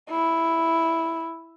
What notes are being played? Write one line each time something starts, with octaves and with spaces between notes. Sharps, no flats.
E4